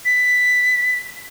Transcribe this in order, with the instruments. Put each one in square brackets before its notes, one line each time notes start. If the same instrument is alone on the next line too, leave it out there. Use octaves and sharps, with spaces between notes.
[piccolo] B6